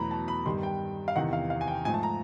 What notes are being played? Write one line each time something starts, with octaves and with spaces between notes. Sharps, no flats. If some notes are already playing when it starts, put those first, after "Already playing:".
Already playing: E2 B2 F#3 A3 A#5 B5
A5
B5
G2 D#3 G3 C6
G5
F5
E2 C3 D#3 F#5
F5
F5
G#5
G5
G#2 F3 A3 G#5
A5
A#5